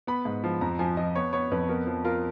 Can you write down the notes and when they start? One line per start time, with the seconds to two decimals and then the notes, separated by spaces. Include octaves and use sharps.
0.07 B3 B5
0.25 G#2
0.44 F3
0.61 F2 A#5
0.79 F3 G#5
0.97 F3 D#5
1.15 B3 C#5
1.33 B3 C#5
1.52 F2 B4
1.69 B3 A#4
1.87 F3
2.05 F4 A#4